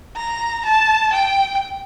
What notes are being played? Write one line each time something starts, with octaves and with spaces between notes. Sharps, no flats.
A#5
A5
G5